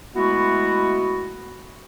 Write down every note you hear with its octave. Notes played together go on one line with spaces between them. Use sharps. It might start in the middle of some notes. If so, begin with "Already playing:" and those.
G#3 A3 B3 E4 F#4